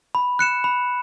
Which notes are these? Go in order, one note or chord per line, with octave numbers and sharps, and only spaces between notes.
B5
F#6 C#7 E7
B5